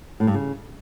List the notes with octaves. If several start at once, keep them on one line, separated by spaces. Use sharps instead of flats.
A2
G2
C#3